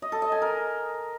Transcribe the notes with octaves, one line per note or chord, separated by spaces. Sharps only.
D#5
A4
D#5
G#5
A#4